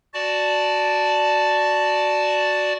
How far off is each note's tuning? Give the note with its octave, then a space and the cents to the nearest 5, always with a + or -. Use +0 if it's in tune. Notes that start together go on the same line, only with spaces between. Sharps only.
F#4 +0 D5 +0 A5 +0